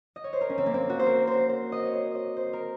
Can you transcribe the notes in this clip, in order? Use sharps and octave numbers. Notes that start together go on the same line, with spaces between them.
D#5
C#5
C5
A#4
C#4
C4
A#3
C4
F#4
C5
A#4
C5
C5
D#5
C#5
C5
D#5
C5
A#4